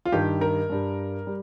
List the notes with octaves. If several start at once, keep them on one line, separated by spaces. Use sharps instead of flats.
F4
G2 D#3 G3 G4
A#4
G2 G3
G3